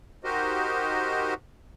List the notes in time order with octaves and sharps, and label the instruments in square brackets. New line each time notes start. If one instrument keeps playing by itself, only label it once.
[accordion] D#4 F#4 G4 A#4 C5 D#5